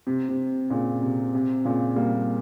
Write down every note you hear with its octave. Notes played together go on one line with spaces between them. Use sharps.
C3
C3
A#2 C#3
C3
C3
A#2 C#3
G3 A#3